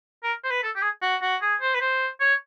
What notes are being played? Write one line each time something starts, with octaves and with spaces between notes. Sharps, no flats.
A#4
C5
B4
A4
G4
G#4
F#4
F#4
G#4
C5
B4
C5
C#5